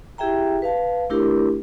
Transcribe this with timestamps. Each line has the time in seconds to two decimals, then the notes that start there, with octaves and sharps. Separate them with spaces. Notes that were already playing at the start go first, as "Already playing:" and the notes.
0.18 E4 G4 G#4 E5 G5 A#5
0.62 B4 F5 A5
1.10 A3 D4 E4 G4 A#4